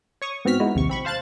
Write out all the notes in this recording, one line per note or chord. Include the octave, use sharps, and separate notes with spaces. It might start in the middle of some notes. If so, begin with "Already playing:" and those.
C#5 C#6 D#6
G#2 B3 C4 F#4 F6 B6
G#3 B3 D#4 E4 F#4
A#1 D#2 C3 C#6
C4 B5 C#6
C5 F5 A5 F#6 A6